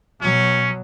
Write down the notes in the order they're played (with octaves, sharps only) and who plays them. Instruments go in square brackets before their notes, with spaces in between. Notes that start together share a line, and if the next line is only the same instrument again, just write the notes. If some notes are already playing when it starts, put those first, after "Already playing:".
[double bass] B2 F#3 [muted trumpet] C#4